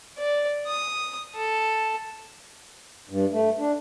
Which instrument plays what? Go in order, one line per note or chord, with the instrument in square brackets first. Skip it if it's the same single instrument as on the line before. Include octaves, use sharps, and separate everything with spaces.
[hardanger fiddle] D5
D#6
A4
[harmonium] G2
A3
D4